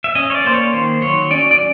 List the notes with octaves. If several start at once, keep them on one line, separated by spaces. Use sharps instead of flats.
E5
C#4 D#5
C#5
D5
A#3 C5
C#5
D#3 C5
F#3 C#5
C#4 D5
D5